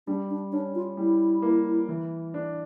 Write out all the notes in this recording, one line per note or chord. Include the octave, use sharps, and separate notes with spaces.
G3 D4
D4
C#4 D4
F4
G3 E4
A#3
E3
D4